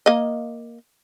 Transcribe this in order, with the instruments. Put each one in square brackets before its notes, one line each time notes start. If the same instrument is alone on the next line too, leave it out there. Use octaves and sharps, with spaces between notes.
[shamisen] A#3 D#5